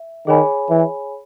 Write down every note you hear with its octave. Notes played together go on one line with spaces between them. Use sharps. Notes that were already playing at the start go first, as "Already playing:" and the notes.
Already playing: E5
D#3 G#4 C#5 G#5 B5
E3